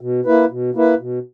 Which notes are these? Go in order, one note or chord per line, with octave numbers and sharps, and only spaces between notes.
B2
A#3 E4 B4
B2
A#3 E4 B4
B2